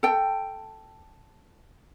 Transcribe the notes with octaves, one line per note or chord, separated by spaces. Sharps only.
A4 G5